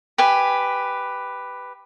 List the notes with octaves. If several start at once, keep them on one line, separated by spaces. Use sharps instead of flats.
G4 B4 G#5